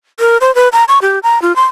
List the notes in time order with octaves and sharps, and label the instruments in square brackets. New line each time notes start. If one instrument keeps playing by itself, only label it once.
[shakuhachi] A#4
C5
B4
A#5
C#6
G4
A#5
F4
C6